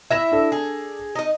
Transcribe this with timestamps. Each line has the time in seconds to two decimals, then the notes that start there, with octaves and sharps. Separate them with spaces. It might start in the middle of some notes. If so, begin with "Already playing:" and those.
0.11 E4 E5 G#6 A#6 E7
0.32 D4 A4
0.52 G#4
1.15 D#4 D#5